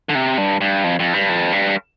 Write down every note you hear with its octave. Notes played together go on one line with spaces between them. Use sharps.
D3
C3
G2
G2
F2
F2
G2
F2
G2